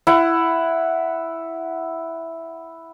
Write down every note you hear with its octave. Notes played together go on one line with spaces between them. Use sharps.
E4 F#5